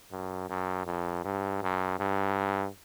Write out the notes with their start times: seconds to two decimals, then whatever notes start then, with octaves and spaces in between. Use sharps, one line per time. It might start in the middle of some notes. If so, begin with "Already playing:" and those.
0.11 F#2
0.49 F#2
0.86 F2
1.24 G2
1.63 F#2
1.99 G2